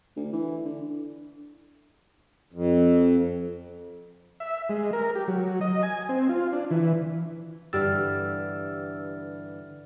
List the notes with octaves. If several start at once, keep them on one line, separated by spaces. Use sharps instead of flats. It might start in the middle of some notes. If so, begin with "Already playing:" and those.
D2
E3
D3
F2
E5
G#3
A#4
G4
F#3
D#5
G#5
C4
F4
D4
E3
G2 D3 E3 G4 D5 E6 F6 A6